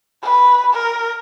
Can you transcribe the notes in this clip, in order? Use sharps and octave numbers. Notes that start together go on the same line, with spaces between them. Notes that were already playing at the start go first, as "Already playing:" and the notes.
B4
A#4